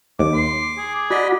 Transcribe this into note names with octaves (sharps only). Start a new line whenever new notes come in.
D#2 D6
C6
G#4
F#4 D5 D#5 B5